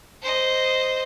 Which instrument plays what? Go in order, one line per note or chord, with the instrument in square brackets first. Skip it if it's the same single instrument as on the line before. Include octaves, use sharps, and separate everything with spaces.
[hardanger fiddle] C5 D#5